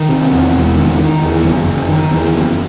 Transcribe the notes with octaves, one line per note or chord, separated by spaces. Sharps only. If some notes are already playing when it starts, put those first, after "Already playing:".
Already playing: D#3
C3
E2
E1
D#3
D#3
E2
F#1
F#1
D#3
E2
F#1